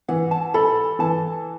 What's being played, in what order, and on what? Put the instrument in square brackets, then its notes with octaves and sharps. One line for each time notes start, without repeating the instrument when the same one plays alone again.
[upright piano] E3 [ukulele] F#5
[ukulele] A5
[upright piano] A4 [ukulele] B5
[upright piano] E3 [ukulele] A5